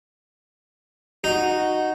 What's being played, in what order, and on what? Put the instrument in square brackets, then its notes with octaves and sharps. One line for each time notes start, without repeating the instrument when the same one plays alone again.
[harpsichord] D#4 [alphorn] F#4